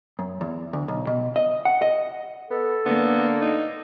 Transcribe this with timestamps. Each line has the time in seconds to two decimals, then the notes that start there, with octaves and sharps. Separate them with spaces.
0.19 F#2
0.41 E2
0.73 D2
0.88 B1
1.07 B2
1.36 D#5
1.65 F#5
1.82 D#5
2.50 B3 A4
2.86 D3 A#3 B3
3.41 D#4